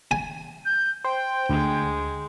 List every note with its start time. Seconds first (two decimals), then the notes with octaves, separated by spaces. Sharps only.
0.11 G#5
0.65 G6
1.04 C5 G5
1.49 D2 G#3